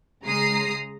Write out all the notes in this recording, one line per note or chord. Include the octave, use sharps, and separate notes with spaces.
C#3 G#3 A#5 D#6 C7